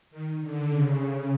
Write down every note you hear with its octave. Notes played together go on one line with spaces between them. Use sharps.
D#3
D3
C#3